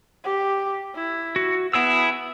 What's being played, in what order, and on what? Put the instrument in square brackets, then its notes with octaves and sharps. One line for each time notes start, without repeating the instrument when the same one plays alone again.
[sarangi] G4
E4
[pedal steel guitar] F#4
[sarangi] B3 [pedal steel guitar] E4 G#4 E6